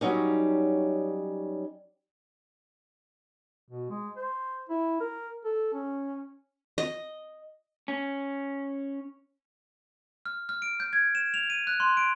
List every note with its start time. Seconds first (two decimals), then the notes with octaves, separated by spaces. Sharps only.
0.01 F#3 G3 C#4 D#4
3.69 B2
3.90 G#3
4.17 C5
4.69 E4
5.00 A#4
5.45 A4
5.73 C#4
6.78 D#5
7.88 C#4
10.26 F6
10.49 F6
10.62 D7
10.80 G6
10.93 G#6
11.15 E7
11.34 F7
11.50 D#7
11.67 F#6
11.80 C6
11.97 D7